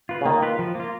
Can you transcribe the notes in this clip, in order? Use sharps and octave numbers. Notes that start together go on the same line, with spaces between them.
F4 B4
C#3
D#3 A#3
F4 B4
F3
A#3 F4